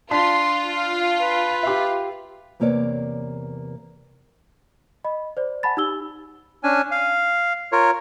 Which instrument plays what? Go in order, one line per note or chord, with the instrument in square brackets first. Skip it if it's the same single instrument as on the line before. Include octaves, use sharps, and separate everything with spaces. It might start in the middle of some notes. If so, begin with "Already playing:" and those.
[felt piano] D4 A5 B6 [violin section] F4 [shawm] C6
[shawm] F5
B4
[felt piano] G4 E5
[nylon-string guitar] E2 C3 A#3 B4 C#5 D5
[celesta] D#5 B5
C5 D5
F#5 G#5 A5 B5 A6
D#4 G4 E6 G7
[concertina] C#4 D4 G#5
F5
F4 A#4 C#5